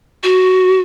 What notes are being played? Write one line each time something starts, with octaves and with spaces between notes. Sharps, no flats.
F#4